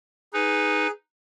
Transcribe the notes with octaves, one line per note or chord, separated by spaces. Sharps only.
D#4 G#4 B4